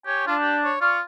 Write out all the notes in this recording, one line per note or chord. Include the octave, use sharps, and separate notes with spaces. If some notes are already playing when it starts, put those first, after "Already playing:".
G4 C#5 G#5
D4 F4
G4
C#5
F4 D5 C#6 F6